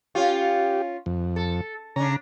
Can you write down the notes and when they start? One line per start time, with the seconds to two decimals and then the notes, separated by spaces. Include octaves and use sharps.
0.15 C#4 F4 G4
1.06 F2
1.36 A4
1.96 C#3 C#4 D4 A#5